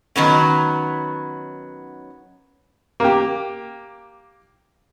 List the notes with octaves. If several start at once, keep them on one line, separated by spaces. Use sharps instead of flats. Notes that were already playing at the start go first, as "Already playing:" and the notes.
D#3 F#3 B3 C#4
A#3 G4